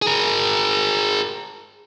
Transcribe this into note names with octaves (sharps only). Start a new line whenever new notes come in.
G#4 A#4